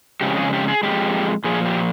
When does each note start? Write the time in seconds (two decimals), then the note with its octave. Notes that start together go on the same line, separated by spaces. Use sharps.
0.21 F2 C#3 G#3 G4
0.37 G#4
0.53 G4
0.68 G#4
0.83 F2 C#3 G#3 G4
1.44 A#2 F3 G#4
1.66 G4